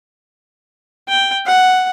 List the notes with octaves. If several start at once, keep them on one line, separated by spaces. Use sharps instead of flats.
G5
F#5